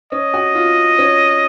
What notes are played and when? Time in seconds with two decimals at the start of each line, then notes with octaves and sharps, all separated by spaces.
0.12 C#4 D#5
0.34 F#4
0.55 F4
0.99 C#4